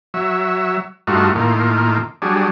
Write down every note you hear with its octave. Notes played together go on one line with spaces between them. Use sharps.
F#3 E5
G2 A3 D#4 F4 F#4
A2 D#3 A#3 F4
F#3 G3 D4 G#4